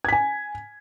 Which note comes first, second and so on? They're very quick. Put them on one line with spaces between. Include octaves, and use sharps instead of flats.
G#6 B6 G#5